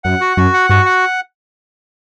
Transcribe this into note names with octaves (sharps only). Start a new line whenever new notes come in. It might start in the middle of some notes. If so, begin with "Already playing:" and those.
F#2 F#5
F#4
F#2 F#4
F#5
G2 F#4
F#5